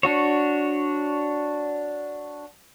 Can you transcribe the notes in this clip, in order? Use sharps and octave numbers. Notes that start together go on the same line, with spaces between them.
D4 F#4 C#5